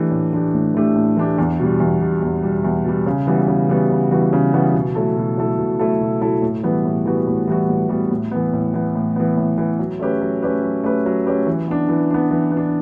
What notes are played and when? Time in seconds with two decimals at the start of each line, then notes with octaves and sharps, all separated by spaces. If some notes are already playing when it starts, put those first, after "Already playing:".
Already playing: E3 A3 D4 G4
0.11 A2
0.33 E3 A3 D4 G4
0.54 A2
0.74 E3 A3 D4 G4
0.96 A2
1.17 E3 A3 D4 G4
1.38 E2
1.60 B2 G3
1.80 E2
2.01 B2 G3
2.22 E2
2.43 B2 G3
2.64 E2
2.85 B2 G3
3.06 C#3
3.27 E3 G3 B3 F#4
3.48 C#3
3.69 E3 G3 B3 F#4
3.90 C#3
4.11 E3 G3 B3 F#4
4.33 C#3
4.54 E3 G3 B3 F#4
4.74 B2
4.95 F#3 A3 E4 A4
5.17 B2
5.38 F#3 A3 E4 A4
5.59 B2
5.79 F#3 A3 E4 A4
6.00 B2
6.21 F#3 A3 E4 A4
6.42 A2
6.63 E3 G3 B3 F#4
6.85 A2
7.06 E3 G3 B3 F#4
7.27 A2
7.48 E3 G3 B3 F#4
7.69 A2
7.89 E3 G3 B3 F#4
8.11 A2
8.31 E3 B3
8.53 A2
8.74 E3 B3
8.95 A2
9.16 E3 B3
9.37 A2
9.58 E3 B3
9.79 F#3
9.99 A3 C#4 G4 B4
10.21 F#3
10.42 A3 C#4 G4 B4
10.62 F#3
10.84 A3 C#4 G4 B4
11.06 F#3
11.26 A3 C#4 G4 B4
11.47 E3
11.68 B3 D4
11.89 E3
12.11 B3 D4
12.31 E3
12.52 B3
12.57 D4